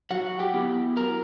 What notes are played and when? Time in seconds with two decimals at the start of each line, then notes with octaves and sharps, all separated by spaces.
0.11 F#3 F#4 F#5
0.39 G4 G5
0.54 B3 E4
0.97 F#3 A#4 A#5